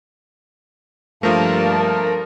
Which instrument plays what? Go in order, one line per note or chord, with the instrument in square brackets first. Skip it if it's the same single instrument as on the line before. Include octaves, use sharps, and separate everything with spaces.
[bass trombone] G2 [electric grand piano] F3 A3 [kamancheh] A#3 A5 [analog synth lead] A#4